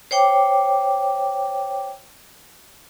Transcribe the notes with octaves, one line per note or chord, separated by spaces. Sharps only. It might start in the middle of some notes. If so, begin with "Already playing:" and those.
C5 C#5 G5 D6